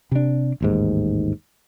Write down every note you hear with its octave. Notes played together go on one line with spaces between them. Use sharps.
C3 D4
A1 D#2 G#2